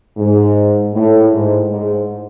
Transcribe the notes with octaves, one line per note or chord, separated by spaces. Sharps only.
G#2
A2
G#2
G#2